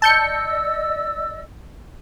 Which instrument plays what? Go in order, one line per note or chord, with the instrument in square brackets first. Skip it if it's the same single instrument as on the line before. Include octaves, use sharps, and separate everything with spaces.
[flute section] D5 D#5 E6 [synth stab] A5 G6 C#7